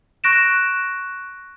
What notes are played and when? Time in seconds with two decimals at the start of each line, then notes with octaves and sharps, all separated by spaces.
0.24 C#6 F#6 A#6 D7 E7